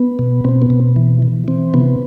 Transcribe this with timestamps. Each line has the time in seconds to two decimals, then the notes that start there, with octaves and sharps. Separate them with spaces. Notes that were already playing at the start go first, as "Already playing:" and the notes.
Already playing: B3
0.19 B2
0.44 B2 C4
0.62 B3
0.70 B2
0.96 E3
1.22 E3
1.48 E3 C4
1.74 C3 B3